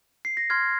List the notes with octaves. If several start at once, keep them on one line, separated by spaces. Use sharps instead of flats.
C7
A#6
C6 F6 G#6